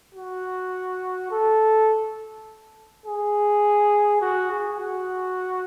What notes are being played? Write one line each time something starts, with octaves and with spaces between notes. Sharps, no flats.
F#4
A4
G#4
F#4
G#4
F#4